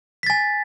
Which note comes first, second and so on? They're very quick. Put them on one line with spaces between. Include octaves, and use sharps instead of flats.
B6 A6 G#5